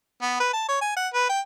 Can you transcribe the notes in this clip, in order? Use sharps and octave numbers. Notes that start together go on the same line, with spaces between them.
B3
B4
A5
C#5
G#5
F#5
B4
G5